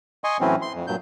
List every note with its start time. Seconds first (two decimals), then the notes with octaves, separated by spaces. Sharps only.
0.24 D#5 G#5 C6 C#6
0.40 A2 E3 F#3 C4 C#4
0.62 C6
0.75 F2
0.87 G2 A#2 F#3 G6